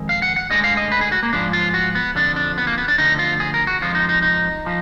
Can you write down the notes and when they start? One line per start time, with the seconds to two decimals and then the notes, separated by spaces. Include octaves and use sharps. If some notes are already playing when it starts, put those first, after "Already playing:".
Already playing: F2 D#3 G#3
0.09 F5
0.22 F#5
0.36 F#5
0.50 D2 D3 F3 G#3 D#5
0.64 F5
0.77 D#5
0.92 B4
1.01 G#4
1.12 F#4
1.23 A#3
1.33 G#2 F3 G#3 D4
1.53 F4
1.74 F#4
1.95 B3
2.15 F2 D3 F3 D4
2.36 D4
2.58 B3
2.67 A#3
2.78 B3
2.88 D4
2.98 D2 D3 F3 D#4
3.19 F4
3.40 G#4
3.54 A#4
3.67 F#4
3.82 F2 F3 G#3 F4
3.95 D#4
4.09 D#4
4.22 D#4
4.66 F3